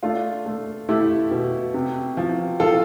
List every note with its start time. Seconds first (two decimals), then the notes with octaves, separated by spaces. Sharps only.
0.03 A3 D4 F4
0.46 A3
0.89 A3 E4 G4
1.31 B2
1.74 C3
2.17 F3
2.60 F3 F4 A4